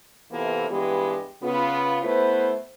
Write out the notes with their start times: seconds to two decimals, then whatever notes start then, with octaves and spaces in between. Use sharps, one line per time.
0.32 C3 E3 A#3 B3 F4 A4
0.69 G2 E3 G#3 B3 G4
1.43 C#3 B3 F4
2.03 A3 B3 E4 B4 C5